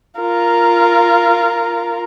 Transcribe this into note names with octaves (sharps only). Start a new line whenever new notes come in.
F4 A#4